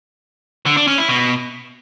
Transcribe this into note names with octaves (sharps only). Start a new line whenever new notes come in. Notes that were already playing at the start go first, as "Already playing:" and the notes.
D3
D4
C#4
E4
B2